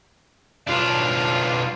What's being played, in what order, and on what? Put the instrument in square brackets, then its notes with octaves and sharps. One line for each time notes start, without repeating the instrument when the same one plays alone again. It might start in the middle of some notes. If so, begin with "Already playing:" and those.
[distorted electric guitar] B1 D4 [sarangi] F4